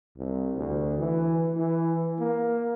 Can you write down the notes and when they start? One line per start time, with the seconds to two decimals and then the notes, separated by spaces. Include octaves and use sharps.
0.18 C2
0.57 D2
0.99 E3
1.57 E3
2.19 A#3